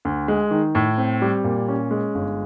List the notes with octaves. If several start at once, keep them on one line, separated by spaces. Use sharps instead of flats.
D2
G#3
D#3
A2
C4
G3
A#2
C#4
G#3
G1